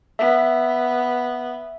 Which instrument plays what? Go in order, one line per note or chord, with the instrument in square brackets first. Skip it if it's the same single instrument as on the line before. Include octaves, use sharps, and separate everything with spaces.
[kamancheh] B3 [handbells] E5